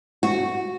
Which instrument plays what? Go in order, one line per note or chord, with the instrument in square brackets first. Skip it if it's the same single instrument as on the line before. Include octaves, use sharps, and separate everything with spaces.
[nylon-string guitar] F#4